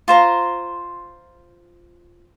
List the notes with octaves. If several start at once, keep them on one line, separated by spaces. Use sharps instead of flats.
F4 C5 A#5